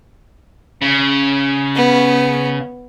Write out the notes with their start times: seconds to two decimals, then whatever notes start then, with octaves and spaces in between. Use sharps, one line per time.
0.82 C#3
1.76 B3